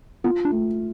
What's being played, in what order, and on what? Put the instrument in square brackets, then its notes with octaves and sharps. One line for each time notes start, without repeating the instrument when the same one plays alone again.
[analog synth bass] B3 [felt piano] F4
[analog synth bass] D4
[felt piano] A3